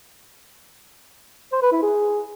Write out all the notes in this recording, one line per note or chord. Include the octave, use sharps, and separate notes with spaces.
C5
B4
E4
G#4